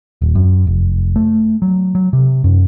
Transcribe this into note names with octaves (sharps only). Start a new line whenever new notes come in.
D#1
F#2
F1
A3
F#3
F#3
C3
F#2